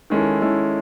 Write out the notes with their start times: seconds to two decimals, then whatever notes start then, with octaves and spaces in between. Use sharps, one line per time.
0.10 D#3 G#3 C#4 E4 A4
0.42 D#3 G#3 C#4 E4 A4